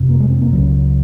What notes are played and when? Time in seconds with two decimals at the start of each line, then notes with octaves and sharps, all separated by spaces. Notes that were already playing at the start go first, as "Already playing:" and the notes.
Already playing: F#1 F2 C3
0.09 A#3
0.20 G#3
0.30 C4
0.41 A#3
0.52 C#2 C#3 F#3